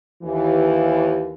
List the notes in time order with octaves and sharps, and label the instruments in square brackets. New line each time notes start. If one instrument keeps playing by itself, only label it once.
[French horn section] D#2 E3